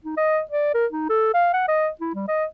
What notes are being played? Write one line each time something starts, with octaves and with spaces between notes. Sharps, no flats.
D#4
D#5
D5
A#4
D#4
A4
F5
F#5
D#5
E4
G3
D#5